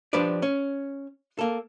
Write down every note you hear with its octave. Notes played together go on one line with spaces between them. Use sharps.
F3 D4 G4 B4 D5
C#4
A#3 A4